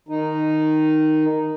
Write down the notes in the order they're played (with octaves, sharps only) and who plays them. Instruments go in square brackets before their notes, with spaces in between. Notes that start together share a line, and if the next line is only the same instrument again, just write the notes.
[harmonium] D#3 D#4